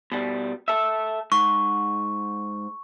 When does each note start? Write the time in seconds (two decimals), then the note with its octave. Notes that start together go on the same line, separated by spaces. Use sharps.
0.12 B2 G3
0.68 A4 E5
1.32 G#2 C#6